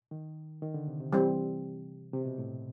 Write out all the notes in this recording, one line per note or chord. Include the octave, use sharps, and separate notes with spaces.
D#3
D#3
D3
C3
C3
E3 G3 C4
C3
B2
A2